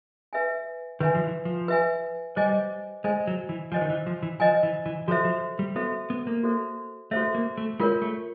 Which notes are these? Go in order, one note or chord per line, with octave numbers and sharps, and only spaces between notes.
B4 E5 G#5
D#3 B4 E5 G#5
F3
E3
F3
B4 E5 G#5
G3 C5 D#5 G#5
G#3 C5 D#5 G#5
F#3
E3
F3 C5 D#5 G#5
D#3
E3
F3
E3
F3 C5 D#5 G#5
E3
E3
F3 F#4 A4 C5 E5
F3
G3
B3 F#4 A4 C5 E5
B3
A#3
F#4 A4 C5 E5
A3 F#4 A4 C5 E5
A#3
A3
G#3 F4 A#4 C#5
A3